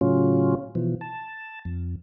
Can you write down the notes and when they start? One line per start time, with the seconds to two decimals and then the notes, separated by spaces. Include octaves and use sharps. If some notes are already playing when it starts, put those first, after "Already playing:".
0.01 A2 C#3 F#3 C#4 F4
0.75 B2 E3 F3
1.01 A5
1.65 F2